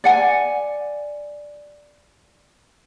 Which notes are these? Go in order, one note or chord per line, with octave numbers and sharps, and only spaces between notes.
D5 F#5 G#5